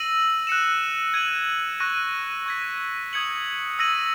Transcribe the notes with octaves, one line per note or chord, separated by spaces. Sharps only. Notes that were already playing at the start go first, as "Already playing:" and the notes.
Already playing: E6 A#6 D#7 F#7
F#6 C#7 E7
G#6 D#7 F#7
C#6 F#6 A#6 D#7
C#6 G#6 B6
D#6 G#6 C#7 F#7
E6 A#6 D#7 F#7